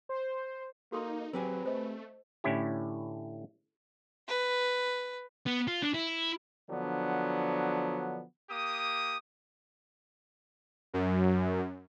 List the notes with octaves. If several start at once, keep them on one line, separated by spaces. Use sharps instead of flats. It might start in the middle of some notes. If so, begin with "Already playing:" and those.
C5
A#3 D#4 F#4 A4 C6
F#3 C4 G4 G#4 B4
A3 C5 D#5
A2 D3 C#4 E4 G4
B4
B3
F4
D4
E4
D3 F3 F#3 B3 D4
A#3 G4 D#6
F#2